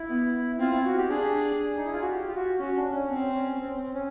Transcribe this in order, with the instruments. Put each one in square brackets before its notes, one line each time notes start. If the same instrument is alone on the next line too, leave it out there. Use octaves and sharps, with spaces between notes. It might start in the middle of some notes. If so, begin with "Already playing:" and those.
Already playing: [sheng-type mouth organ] E4
[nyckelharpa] B3
[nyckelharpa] C4 [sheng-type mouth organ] F4
[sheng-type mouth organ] E4
F#4
G4
[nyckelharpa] D4 [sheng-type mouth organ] G#4
[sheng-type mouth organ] D#4
E4
F4
F#4
G4
F4
F#4
[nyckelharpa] C#4 [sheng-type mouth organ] F#4
[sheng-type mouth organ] D4
C#4
[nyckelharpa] C4
[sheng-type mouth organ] C#4
C4
C4
C#4